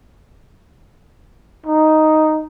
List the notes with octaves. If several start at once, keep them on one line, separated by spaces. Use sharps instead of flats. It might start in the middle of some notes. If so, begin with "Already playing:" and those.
D#4